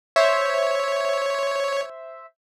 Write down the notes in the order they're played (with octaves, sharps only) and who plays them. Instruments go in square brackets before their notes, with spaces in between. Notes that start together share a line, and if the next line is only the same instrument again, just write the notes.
[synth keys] C5 E5 [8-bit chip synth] C#5